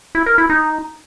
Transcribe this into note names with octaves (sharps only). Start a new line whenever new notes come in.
E4
A#4
E4
D#4